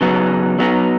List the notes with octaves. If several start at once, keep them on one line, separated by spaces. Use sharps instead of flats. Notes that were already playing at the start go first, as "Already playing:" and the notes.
C#3 F#3 B3 D#4
F#3 B3 D#4